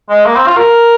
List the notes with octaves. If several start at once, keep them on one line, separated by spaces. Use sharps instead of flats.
G#3
A#3
C4
F4
A#4